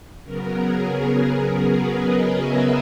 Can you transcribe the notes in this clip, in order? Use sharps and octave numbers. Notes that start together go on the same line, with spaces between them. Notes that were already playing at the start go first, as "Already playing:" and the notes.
C#3 F#3 B3 A#4
G#4
A#4
B4
D#5
E5